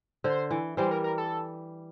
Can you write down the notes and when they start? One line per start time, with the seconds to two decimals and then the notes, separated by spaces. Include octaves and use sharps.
0.24 D3 C5
0.51 E3
0.77 E3 G3 C5
0.91 A#4
1.04 A#4
1.18 A4